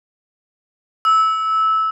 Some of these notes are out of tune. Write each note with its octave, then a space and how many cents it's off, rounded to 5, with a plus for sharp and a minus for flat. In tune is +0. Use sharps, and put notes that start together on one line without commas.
E6 -15